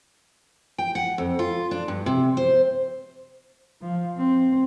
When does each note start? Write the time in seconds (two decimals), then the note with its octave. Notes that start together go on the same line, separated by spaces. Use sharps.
0.78 G5
0.95 F#5
1.18 F2
1.39 F4
1.71 D4
1.88 G2
2.06 C3
2.37 C5
3.81 F3
4.18 C4